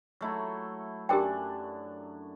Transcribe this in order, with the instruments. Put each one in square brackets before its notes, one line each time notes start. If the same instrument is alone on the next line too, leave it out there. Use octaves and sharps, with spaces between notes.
[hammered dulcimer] F#3 A3 E4
[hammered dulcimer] F#2 D4 [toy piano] G4 A#4 G5